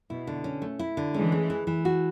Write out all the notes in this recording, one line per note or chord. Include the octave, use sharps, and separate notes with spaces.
B2 E4
D3
C#4
A3
E4
D3
E3 G#3 C#4
A3
E3
E3
F#4